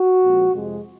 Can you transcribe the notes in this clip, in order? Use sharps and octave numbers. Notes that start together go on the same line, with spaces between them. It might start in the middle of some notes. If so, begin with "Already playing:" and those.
Already playing: F#4
A#2 F3 G#3 C4
F2 C3 F3 G#3